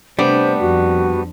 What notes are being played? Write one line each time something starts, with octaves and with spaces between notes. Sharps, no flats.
C3 G3 A3 B3 D4 C5
F2 F#4